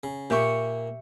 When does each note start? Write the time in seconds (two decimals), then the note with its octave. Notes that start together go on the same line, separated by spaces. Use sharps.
0.03 C#3
0.30 A#2 A#3 G4 E5 C#6